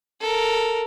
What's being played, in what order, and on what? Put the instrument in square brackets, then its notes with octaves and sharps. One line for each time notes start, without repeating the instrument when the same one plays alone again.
[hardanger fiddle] A4 A#4